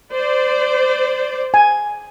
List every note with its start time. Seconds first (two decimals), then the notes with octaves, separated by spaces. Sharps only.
0.12 C5 D5
1.54 G#5